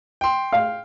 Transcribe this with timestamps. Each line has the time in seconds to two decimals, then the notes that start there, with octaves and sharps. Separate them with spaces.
0.21 G5 C6
0.52 F5